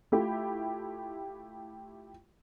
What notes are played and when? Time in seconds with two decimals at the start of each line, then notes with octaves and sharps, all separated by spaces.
0.12 A3 E4 F4 G4